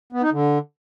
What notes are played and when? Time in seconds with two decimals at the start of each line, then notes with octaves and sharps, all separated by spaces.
0.12 B3
0.22 D#4
0.32 D3